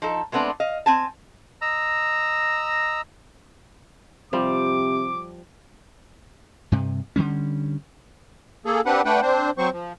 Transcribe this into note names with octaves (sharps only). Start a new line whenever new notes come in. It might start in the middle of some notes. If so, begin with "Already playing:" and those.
F3 D#4 A4
G#3 A3 B3 C4 D4
D#5 F5
C4 G#5 A5
D#5 A#5 E6
C3 F3 G3 D6
G2 C3
D3 E3 G3 C#4
A#3 G#4 A4
C4 D4 G4 B4 F#5
A3 D4 B4 F#5 G5
C4 D4 C5
F#3 C4 C5 C#6
F3